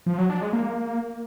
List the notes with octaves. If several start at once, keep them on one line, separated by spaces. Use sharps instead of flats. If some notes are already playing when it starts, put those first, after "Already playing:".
F3
F#3
D4
G#3
A#3